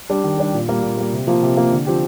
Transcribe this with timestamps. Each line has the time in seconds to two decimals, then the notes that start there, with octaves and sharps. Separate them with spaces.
0.10 G3 D4 G4
0.24 D#3
0.38 G3 D4 G4
0.54 A#2
0.69 G3 A#3
0.83 A#2
0.97 G3 A#3
1.13 C3
1.27 F3 A#3 F4
1.43 C3
1.57 F3 A#3 F4
1.71 D3
1.86 F3 C4 G4